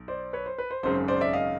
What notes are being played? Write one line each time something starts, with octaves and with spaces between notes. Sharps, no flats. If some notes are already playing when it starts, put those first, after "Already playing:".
Already playing: B1
C5 D5
B4 C#5
C5
B4
C5
G#1 F#2 C#3 C5
C5 D5
D5 E5
D#5 F5